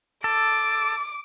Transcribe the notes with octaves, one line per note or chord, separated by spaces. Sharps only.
A4 D6